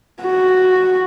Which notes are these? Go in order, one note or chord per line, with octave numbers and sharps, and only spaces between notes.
F#4